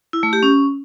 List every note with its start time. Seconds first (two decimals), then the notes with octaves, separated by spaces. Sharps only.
0.13 E4
0.23 A3
0.33 G4
0.43 C#4